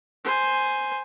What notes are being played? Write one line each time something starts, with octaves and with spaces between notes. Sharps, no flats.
C5 G#5